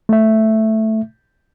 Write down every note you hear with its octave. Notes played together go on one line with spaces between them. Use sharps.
A3 E5